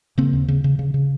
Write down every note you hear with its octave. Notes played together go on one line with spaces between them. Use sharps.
C#3 A#3 C4
D#2
C#3
C#3
C#3
C#3